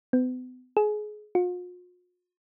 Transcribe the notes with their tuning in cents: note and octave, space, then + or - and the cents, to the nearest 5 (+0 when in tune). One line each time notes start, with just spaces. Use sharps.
B3 +40
G#4 +25
F4 +45